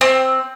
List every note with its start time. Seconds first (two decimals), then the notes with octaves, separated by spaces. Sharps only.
0.01 C4